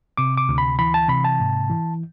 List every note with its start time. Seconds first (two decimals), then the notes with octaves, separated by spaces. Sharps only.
0.17 C3 D6
0.37 D6
0.49 D2
0.58 B5
0.79 E3 B5
0.94 A5
1.09 C3 B5
1.24 A5
1.40 G#2
1.70 E3